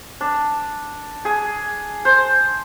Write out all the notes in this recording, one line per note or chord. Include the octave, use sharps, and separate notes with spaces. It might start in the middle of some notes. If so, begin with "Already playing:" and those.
D4
G#4
C5